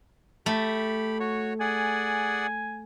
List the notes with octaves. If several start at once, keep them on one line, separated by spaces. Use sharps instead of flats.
A3 G4 B5
F#4 C#5
G#4 D5 F#5 G#5